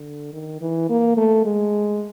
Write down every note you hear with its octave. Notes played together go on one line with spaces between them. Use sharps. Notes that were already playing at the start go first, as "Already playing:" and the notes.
Already playing: D3
D#3
E3
A#3
A3
G#3